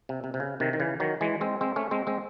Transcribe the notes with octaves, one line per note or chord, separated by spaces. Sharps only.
C3
C3
C3
C#3
C3 D#3
D#3
C#3 E3
D#3 F#3
E3 G#3
G#3 C4
G#3 C4
A3 C#4
G#3 C4
G#3 C4